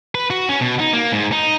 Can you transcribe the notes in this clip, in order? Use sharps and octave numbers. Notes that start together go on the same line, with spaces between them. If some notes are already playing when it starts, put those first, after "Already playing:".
B4
F#4
C#4
B2
D#4
A#3
G#2
D#4